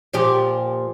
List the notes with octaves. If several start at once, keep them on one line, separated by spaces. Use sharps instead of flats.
A#2 F3 G4